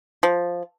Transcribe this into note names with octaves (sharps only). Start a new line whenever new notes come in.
F3